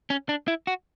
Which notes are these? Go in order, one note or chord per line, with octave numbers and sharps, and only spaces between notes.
C#4
D4
E4
F#4